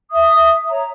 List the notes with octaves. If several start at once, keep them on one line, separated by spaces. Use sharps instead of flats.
E5 D#6
C#5 A#5